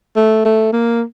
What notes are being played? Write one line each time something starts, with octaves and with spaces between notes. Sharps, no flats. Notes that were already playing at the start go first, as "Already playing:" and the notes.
A3
A3
A#3